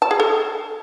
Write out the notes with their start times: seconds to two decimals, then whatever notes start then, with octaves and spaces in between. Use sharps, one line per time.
0.02 A5
0.11 G#4
0.20 A4